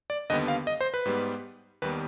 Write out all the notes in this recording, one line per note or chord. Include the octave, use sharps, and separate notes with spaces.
D5
D#2 D3 G3 B3 D#5
F5
D#5
C5
B4
G#2 G3 B3
D#2 D#3 G3 B3 B4